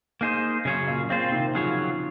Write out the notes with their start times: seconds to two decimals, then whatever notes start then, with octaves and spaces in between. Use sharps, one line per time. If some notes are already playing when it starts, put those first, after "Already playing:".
0.21 A#3 D#4 G#4 C5
0.65 F#2 C#3 F#3 C#4 G#4 C#5
0.88 F#2 A#2
1.09 A#2 C#3 C4 F4 C5
1.32 C3 D#3
1.55 C#3 F3 F#3 C#4 G#4 C#5